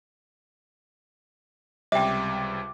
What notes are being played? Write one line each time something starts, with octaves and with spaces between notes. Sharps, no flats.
C#2 C3 G3 E5 G5 D6